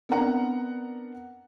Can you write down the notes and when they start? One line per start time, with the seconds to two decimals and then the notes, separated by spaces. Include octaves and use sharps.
0.09 B3 C4 D4 A#4 F#5 A#5